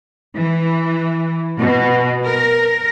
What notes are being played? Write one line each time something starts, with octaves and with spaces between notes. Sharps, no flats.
E3
B2
A#4